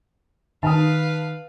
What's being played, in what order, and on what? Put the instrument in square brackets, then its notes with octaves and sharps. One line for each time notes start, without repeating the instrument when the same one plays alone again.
[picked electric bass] D#3 [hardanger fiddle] B4 F5 [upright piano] A5 D#6